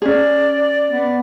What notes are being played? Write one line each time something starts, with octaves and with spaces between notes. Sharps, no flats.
C#4 G#4 D5
B3